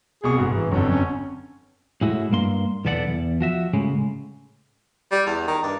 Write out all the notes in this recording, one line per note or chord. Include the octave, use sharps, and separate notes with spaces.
C2 B2 G#4 C#6
G1 G#2 F#4
E3
G1 F2 D3 F#3
C#4
A2 G#3 E4 F#4
G2 A#3 C6
B1 E2 B3 A4 D5 F#5
E2
F3 F#4 E5
A2 C#3 G#3
G3
E2
D#3
G2